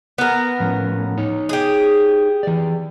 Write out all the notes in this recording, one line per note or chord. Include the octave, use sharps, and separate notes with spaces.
B3 A#4
A2 F3 C#4
D#4 C#5
G4 G#4
E3 D5